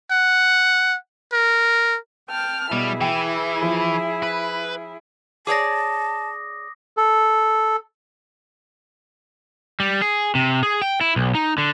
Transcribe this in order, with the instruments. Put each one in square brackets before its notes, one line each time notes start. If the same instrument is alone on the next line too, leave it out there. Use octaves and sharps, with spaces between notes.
[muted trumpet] F#5
A#4
[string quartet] G5 A5 F6
[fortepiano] B2 [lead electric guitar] G3 [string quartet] E4 G#4
[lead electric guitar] E3 [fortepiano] G5
[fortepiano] F3
[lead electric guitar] B4
[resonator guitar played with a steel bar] G#4 C#5 D5 [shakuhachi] A5 [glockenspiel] D6 D#6 A#6
[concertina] A4
[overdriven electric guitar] G3
G#4
C3
G#4
G5
E4
B1
D#4
D3